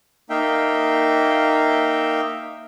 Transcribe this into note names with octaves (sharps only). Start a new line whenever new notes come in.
A#3 D#4 E5 F5 G5